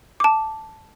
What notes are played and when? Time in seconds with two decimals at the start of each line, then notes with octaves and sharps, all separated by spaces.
0.20 A5 D6